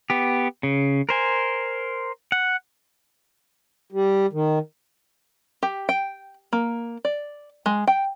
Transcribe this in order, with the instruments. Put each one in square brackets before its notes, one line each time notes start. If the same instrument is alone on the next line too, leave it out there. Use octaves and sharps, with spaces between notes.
[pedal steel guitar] B3 G4
C#3
A#4 C5 G#5
F#5
[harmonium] G3
D#3
[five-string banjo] G4
G5
A#3
D5
G#3
G5